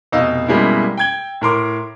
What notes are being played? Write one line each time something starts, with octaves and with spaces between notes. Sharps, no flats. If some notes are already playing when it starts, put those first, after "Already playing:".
F1 B2 D#4 D#5 F5 E6
F#2 B2 G3 G#3 A#3 E4
G5 G#6 G7
A2 A#4 C6 D6